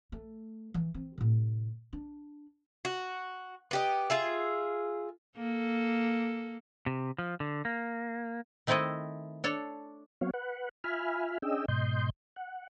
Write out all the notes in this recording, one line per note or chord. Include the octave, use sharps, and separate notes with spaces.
A3
E3
C4
A2 C3
D4
F#4
B3 G4 D#5
F4 G#4 E5
A#3 A4
C3
F3
D3
A#3
D#3 A3 C4 E4 A4 D#5
D4 A4 C#5
F#3 B3 C4 F#4 C#5 F5
B4 F#5
F4 E5 G#5 B5 F6
C#4 D4 G#4 D#5 G5 E6
G#2 B2 D#5 C6 G6
F#5